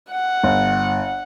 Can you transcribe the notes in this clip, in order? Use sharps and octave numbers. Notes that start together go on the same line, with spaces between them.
F#5
G1